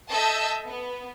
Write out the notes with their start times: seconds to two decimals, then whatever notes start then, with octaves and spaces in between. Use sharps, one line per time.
0.10 A4 D#5 E5 A5 E6 G6
0.65 B3